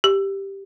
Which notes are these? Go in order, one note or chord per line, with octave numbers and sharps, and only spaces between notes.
G4